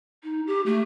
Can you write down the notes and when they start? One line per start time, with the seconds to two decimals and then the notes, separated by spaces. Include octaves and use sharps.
0.24 D#4
0.47 G4
0.66 A3